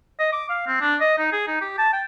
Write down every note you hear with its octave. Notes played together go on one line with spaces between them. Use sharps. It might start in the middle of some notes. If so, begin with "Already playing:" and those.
D#5
D6
F5
C4
D4
D#5
D#4
G#4
D#4
G4
A5
G5